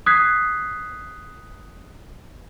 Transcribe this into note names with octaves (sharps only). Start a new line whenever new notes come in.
D#6 F#6 G#6 B6 C7